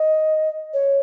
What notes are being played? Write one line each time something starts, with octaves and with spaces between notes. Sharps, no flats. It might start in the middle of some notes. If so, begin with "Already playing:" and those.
Already playing: D#5
C#5